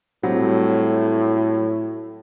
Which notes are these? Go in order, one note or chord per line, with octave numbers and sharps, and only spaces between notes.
A2 F#3 G3 C4